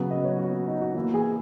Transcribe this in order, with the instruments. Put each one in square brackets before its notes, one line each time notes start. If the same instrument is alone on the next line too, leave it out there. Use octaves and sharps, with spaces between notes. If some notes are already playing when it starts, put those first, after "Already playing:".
Already playing: [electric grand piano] C#3 F#3 B3 [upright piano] F#5
[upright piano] D#5
C#5
F#4
D#4
F#4
[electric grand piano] E3 A#3 E4 [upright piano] F#4
[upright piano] G#4